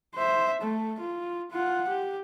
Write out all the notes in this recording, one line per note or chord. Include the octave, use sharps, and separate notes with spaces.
C5 E5
A3
F4
F4 F#5
G4